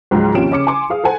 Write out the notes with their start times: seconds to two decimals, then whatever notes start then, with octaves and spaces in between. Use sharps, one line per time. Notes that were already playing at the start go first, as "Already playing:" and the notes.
0.11 C#2 G#2 F3 F#3 G#3
0.34 D#2 C3 F3 C#4 D7 E7
0.51 C#3 C#4 D6 C#7
0.67 G#5 C6 D6
0.90 G#4 F5 D#6
1.04 A4 C5 F#5 G#5 A5